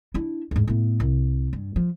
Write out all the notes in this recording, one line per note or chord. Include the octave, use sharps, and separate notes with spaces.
D4 E4
D#2 G#2
A2 B3
C2
G2
F3